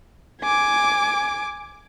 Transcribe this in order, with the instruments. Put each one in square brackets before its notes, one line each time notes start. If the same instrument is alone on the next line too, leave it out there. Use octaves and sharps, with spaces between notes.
[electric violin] G#5 D6